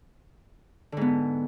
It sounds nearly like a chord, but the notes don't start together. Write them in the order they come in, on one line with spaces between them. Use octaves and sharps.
D3 G#2 B3